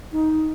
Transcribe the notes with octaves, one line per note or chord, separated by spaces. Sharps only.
D#4